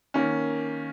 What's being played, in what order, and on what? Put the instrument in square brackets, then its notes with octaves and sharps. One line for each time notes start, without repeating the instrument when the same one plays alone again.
[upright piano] D#3 A#3 C#4